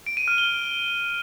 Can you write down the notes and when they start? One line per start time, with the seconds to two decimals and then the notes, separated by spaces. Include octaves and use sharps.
0.07 D7
0.17 D#7
0.28 F6
0.38 G7